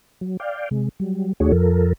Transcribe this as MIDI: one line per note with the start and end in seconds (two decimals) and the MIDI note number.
0.21 0.37 54
0.40 0.69 74
0.40 0.69 77
0.40 0.69 79
0.71 0.89 48
0.71 0.89 56
1.00 1.33 54
1.00 1.33 55
1.40 1.52 39
1.40 1.52 57
1.40 1.52 62
1.40 1.52 66
1.40 1.52 68
1.40 1.52 73
1.52 1.93 41
1.52 1.93 53
1.52 1.93 69
1.52 1.93 70